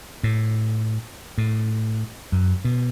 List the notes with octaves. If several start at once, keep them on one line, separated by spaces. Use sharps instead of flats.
A2
A2
F#2
B2